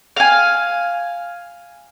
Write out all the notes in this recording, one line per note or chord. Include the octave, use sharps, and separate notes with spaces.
F5 G#5